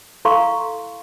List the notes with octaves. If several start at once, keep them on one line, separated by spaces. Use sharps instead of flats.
E4 A4 F5 A#5 C6 C#6